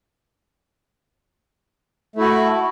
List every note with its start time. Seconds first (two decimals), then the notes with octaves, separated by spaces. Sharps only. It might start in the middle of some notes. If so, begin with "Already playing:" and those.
2.16 A3
2.18 E4
2.21 F#4